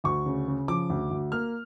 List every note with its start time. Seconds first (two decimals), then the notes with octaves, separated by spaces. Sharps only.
0.04 D2 C#6
0.26 C#3
0.48 C#3
0.68 F3 D6
0.90 D2
1.11 D2
1.32 A#3 F6